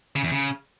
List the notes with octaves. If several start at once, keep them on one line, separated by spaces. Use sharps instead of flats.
C#3
E2
C#3